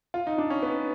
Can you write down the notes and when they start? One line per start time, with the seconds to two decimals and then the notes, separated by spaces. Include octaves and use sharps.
0.14 F4
0.27 D#4
0.38 D4
0.50 C#4
0.63 B3